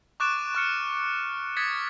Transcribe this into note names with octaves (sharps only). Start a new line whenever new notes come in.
C#6 D6 F#6 A6 D7 E7
C#6 F6 C#7
D#6 G#6 A6 B6 C#7